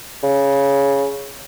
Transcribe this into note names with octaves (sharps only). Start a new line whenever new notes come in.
C#3